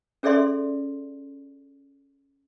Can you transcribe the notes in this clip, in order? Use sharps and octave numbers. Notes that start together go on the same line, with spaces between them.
C#4 G#4 A4 D5 E5 C6